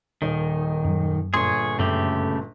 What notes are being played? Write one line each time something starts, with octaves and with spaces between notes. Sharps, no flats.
D#1 D#3 D#4
F#2 F#3
G1 A#2 G#4 C#5 C6
F#2 C#3 A3 G4